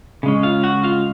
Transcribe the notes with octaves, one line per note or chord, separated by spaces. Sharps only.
C#3 G#3 C#4
F4 F5
F#4 F#5
F4 F5